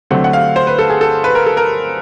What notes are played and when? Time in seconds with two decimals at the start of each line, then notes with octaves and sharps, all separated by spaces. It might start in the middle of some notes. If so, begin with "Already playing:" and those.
0.11 D3 F#3 A3 C4 F#5
0.24 F#5
0.33 F5
0.56 C5
0.67 B4
0.78 A4
0.90 G#4
1.01 A4
1.24 B4
1.35 A#4
1.46 A4
1.57 A#4